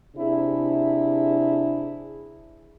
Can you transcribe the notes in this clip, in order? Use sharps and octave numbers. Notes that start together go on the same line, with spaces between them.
C3 D4 E4 G#4